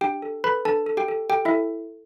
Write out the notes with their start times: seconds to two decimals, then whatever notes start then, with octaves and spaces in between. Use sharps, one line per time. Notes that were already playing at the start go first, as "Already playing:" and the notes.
0.01 D4 G4 G5
0.22 A4
0.44 A4 B4 B5
0.65 D4 A4 A5
0.86 A4
0.97 G4 G5
1.08 A4
1.30 G4 A4 G5
1.45 E4 E5
1.51 A4